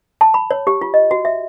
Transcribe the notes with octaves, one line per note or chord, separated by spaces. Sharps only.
A5
B5
C#5
G4
F4
D#5
F#4
E5